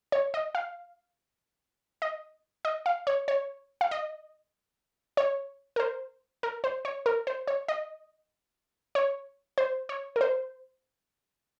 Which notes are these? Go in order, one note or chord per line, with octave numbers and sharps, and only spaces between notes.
C#5
D#5
F5
D#5
D#5
F5
C#5
C#5
F5
D#5
C#5
A#4
C5
A#4
C5
C#5
A#4
C5
C#5
D#5
C#5
C5
C#5
A#4
C5